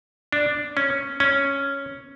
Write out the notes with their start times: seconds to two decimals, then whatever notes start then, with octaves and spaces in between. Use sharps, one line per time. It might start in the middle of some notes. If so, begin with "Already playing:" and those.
0.33 D4
0.77 C#4
1.20 C#4